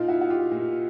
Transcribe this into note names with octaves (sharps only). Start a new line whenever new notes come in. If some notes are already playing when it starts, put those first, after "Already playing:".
Already playing: A#2 D#4 F4
E4 F#4
F#4
F4 G4
A#2